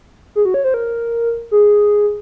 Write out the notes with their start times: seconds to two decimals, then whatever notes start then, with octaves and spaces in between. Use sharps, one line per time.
0.35 G#4
0.45 F#4
0.54 C#5
0.64 C5
0.74 A#4
1.51 G#4